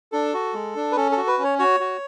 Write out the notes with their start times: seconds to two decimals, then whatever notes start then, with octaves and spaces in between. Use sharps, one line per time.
0.12 D4 A4
0.34 F#4
0.54 G#3
0.76 D4
0.92 B4
0.96 C#4 A4
1.12 A4
1.17 F#4
1.27 B4
1.39 C#4
1.44 C#5
1.59 F#4 C#5
1.80 F#4